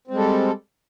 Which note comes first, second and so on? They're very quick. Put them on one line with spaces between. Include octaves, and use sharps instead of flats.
C4 G#3 G3 A4